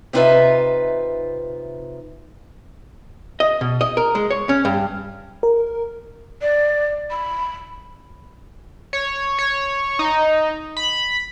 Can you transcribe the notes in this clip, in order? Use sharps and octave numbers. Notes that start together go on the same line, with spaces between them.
C3 B3 D#4 F4 B4 E5
D#5
B2
D#5
A#4
G#3
C#5
C#4
G2
A#4
D5
B5
C#5
C#5
D#4
B5